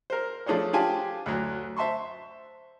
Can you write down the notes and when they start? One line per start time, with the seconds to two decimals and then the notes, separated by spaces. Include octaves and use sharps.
0.10 A#4 C5
0.46 F3 A3 D4 G#4 C5 C#5
0.73 D4 F4 G4 G#5 A5
1.26 D2 F#3
1.77 C5 E5 A5 C6 C#6